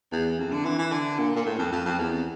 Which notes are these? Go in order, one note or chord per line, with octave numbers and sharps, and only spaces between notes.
E2
F2
D3
E3
E3
D3
A#2
A#2
A2
F2
F2
F2
E2